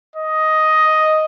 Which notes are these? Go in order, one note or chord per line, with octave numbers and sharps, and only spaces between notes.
D#5